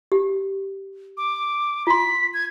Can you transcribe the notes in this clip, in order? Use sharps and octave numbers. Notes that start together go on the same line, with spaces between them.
G4
D6
F4 C6 B6
G#6